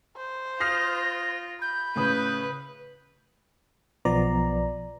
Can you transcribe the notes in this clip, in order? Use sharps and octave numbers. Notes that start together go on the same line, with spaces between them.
C5
F4 D#6 F6 A#6 C7
B5 G6
A2 C#3 B4 D#6
B1 F3 B3 D5 A#5